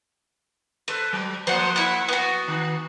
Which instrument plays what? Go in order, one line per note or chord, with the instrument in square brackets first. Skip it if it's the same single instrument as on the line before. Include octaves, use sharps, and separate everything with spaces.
[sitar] A4 B4 [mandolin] C5
[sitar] F#3
[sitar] F3 A#3 [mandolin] C5 F#5
[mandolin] E4 F#5
B3 F#4
[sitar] D#3